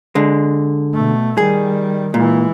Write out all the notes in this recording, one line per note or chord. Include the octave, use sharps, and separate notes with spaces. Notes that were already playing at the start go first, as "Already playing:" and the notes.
D3 G#3
B2 A3
D#3 G3 G#4
A#2 E3 G#3